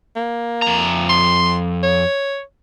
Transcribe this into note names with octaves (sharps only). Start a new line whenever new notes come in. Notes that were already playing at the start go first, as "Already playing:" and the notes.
A#3
F2 A#5
C6
C#5